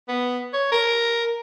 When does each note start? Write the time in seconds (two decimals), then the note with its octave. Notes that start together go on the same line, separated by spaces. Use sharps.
0.09 B3
0.53 C#5
0.72 A#4